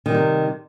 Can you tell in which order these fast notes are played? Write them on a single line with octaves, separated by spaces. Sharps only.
D#3 G3 C3